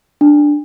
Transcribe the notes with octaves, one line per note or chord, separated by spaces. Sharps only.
D4